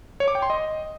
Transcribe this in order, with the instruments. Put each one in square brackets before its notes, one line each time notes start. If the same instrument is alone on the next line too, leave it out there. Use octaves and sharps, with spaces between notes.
[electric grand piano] C#5
D6
G5
C6
D#5